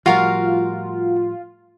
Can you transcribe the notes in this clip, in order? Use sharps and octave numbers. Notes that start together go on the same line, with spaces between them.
A2 F3 G3 F4 F#4 A#4 F5